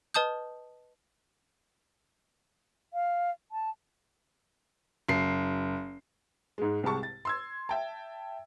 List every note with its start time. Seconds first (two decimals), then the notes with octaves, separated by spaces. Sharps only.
0.14 B4 D#5 A5 D#6 G6
2.94 F5
3.52 A5
5.08 F#1 C7
6.58 G#2 G#3
6.83 C2 C3 G#3 A5 C#6
7.03 A6
7.25 C6 E6 G#6
7.69 E5 G5 A5